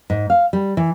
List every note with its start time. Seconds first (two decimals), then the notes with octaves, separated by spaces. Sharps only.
0.10 G#2
0.30 F5
0.53 G3
0.77 E3